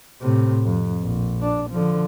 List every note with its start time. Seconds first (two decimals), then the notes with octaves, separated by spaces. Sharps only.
0.21 A2 C3
0.65 F2
1.03 A#1
1.42 D4
1.70 D3 F3